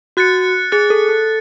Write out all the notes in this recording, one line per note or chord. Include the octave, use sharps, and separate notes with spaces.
F#4 F#6 A6 C#7
G#4 F#6 A6 C#7
A4
A4